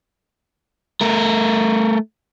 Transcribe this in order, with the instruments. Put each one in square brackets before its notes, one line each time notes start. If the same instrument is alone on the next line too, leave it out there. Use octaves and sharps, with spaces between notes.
[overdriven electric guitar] A3 A#4